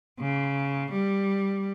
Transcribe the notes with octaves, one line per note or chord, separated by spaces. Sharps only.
C#3
G3